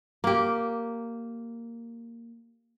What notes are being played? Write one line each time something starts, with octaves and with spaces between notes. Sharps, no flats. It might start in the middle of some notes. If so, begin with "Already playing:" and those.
A#3 G4